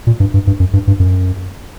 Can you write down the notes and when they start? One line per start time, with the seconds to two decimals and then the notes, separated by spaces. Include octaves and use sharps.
0.07 A#2
0.20 G2
0.34 G2
0.47 G2
0.60 F#2
0.73 G2
0.87 G2
1.00 F#2